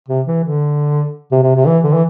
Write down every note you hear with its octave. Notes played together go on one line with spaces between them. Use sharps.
C3
E3
D3
C3
C3
C3
E3
D3
E3